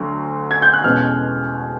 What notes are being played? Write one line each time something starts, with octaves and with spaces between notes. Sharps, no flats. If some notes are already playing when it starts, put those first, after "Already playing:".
Already playing: D2 F#3
G#6
G6
F#6
E2 B2 G#3 C#4 F6